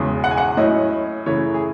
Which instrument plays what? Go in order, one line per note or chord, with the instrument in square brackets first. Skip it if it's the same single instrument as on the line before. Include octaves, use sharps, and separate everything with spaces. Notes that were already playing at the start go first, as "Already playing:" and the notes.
Already playing: [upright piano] E1 E2 C#3 G#3
F#5
G#5
F#5
A2 F#3 C#4 E4 D#5
F#2 C#3 E3 A3 C#5
G#4